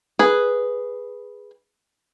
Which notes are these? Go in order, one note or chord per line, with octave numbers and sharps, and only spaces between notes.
G#4 B4